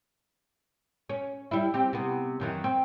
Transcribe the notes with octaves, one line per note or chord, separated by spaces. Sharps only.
C#4
G3 E4
C4 G4
C3 B3
F#2 D#3 E3
C4